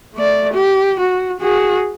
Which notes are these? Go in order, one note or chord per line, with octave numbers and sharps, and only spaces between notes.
A3 D5
G4
F#4
F#4 G#4